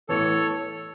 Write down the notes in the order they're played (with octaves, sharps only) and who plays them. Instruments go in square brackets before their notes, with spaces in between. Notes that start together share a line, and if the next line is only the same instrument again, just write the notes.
[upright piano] A1 A2 E3 B3 [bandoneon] A4 C#5